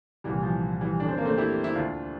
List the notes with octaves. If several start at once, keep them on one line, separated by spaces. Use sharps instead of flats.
C2 A#2 E3 G3
F3
E3 G3
F2 D3 D4
C4
A#3
A3 C4
E4 G4
E4
D2 D3 D4 F4